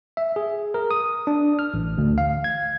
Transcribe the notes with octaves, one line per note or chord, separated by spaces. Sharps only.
E5
G#4
A#4
D#6
D4
F6
A1
D2
F5
G#6